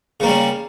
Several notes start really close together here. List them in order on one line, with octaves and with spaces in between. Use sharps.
C#3 A#3 G3 C#4